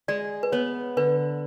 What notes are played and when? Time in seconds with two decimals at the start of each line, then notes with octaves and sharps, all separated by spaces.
0.08 G#3 D5
0.43 B4
0.52 B3 C#5
0.97 D3 B4